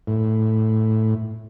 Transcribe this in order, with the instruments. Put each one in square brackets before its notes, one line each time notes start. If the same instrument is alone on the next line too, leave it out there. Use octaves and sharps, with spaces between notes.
[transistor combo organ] A2